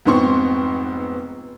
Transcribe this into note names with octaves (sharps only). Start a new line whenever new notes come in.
F1 G#2 B3 C4 C6 C#6